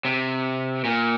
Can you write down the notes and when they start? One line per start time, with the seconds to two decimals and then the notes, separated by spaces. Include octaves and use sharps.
0.05 C3
0.85 A#2